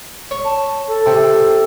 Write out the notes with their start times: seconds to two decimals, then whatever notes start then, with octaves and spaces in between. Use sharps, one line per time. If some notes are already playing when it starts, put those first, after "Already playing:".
0.31 C#5
0.45 A5
0.88 A4
1.06 C3